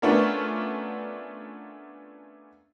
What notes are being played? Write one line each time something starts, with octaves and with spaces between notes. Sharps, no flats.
A3 B3 C#4 D4 F4 A#4